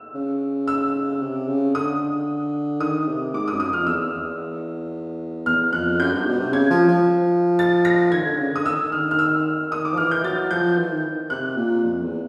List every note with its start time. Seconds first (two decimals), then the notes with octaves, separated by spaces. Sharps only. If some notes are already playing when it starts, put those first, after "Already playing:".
Already playing: E6
0.15 C#3
0.68 E6
1.21 C3
1.48 C#3
1.74 D3 D#6
2.80 D#3 D#6
3.08 C3
3.33 G#2 D6
3.48 D#6
3.52 F#2
3.60 D#6
3.69 F2 F6
3.87 E2 E6
4.14 E2
5.46 E2 F6
5.73 F2 F#6
6.00 F#2 G6
6.13 G2
6.26 B2
6.40 C3
6.52 C#3 G#6
6.70 F3
6.88 F3
7.59 A6
7.85 A#6
8.12 D#3 G#6
8.25 D3
8.39 C#3
8.51 D3 D#6
8.65 D#3 E6
8.78 D3
8.91 D#3 F6
9.11 F6
9.19 E6
9.71 D#3 D#6
9.85 D6
9.94 F3
9.97 E3 F6
10.11 G6
10.24 F#3 A6
10.51 F3 G6
10.78 E3
10.91 D#3
11.30 C3 F#6
11.57 A#2
11.84 F2
12.02 E2